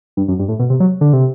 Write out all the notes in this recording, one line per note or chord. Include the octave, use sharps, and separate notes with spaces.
G2
F#2
G2
A2
B2
C3
F#3
D3
C3